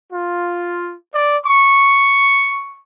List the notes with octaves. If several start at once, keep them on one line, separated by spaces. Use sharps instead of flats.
F4
D5
C#6